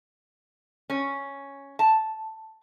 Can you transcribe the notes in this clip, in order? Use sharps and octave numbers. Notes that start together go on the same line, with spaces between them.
C#4
A5